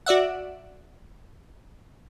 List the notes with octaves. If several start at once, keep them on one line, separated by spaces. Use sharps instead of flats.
F#4 D5 E5 F#5